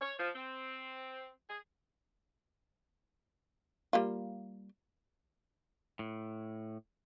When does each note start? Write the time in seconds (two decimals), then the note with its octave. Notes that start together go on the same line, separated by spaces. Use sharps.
0.01 C#5
0.18 F3
0.35 C4
1.49 G#4
3.93 G3 A#3 F4
5.99 A2